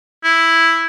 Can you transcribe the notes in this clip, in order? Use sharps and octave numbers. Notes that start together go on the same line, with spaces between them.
E4